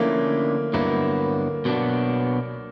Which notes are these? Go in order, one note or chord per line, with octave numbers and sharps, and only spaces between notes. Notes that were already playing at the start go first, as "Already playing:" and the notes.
Already playing: D3 F3 A3 A#3 C#4 E4
G2 D3 F#3 A#3 B3 E4
B2 F#3 B3 D4